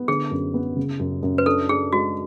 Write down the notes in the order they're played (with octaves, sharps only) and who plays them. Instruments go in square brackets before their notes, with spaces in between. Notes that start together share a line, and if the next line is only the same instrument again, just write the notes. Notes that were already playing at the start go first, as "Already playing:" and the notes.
Already playing: [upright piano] B3
[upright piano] D3 [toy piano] G#4
[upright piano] F#2
B3
C#3
F#2
F#2
[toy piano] B4
[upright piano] D4 [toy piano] A4
[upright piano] D4 [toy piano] G#4
[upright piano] G#3 [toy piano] F#4